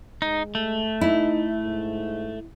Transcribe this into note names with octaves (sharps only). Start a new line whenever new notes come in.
G#3 D#4
A3
D#4 E4
G#2